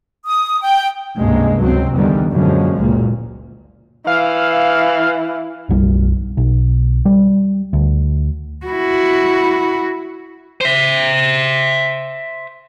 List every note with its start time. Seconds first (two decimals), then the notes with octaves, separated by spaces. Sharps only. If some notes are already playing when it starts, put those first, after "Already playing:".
0.25 D#6
0.62 G5
1.18 C#2 G2 C3 G#3 A#3
1.59 C#2 F#3 C4
1.94 E2 G2 D3 D#3 G3
2.31 F#2 A#2 D3 F3 G#3
2.79 F#1 C#2 A#2
4.07 E3 F5
5.69 F#1 B1 G3
6.37 B1
7.05 G3
7.73 D2
8.66 E4 F#4
10.61 C5 E5